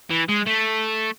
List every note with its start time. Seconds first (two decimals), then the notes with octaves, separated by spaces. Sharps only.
0.11 E3
0.29 G#3
0.47 A3